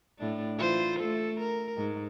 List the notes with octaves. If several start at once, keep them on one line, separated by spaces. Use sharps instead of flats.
A2 D4
E3 F4 C5
A3 A4
A#4
G#2